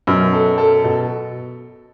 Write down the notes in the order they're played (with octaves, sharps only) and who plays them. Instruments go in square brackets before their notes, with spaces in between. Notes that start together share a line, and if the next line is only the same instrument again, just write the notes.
[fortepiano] F#2 [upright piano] B2
[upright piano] A4
A4
B2